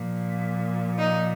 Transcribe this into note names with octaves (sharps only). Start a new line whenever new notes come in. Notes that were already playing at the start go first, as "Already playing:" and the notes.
Already playing: A#2 F3
D#4